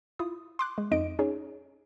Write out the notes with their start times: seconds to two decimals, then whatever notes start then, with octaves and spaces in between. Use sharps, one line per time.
0.19 E4 F4 D#6
0.59 C6 D6 F#6
0.78 G#3
0.91 F2 D#4 D#5 D7
1.19 C#4 D#4 G#4 C#5